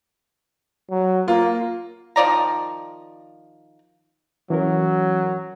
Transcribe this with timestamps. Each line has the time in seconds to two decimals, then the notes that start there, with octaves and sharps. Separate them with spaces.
0.90 F#3
1.28 A#3 F4 A#4
2.16 D#3 F3 D5 A#5
4.50 E3 F#3 C#4 A#4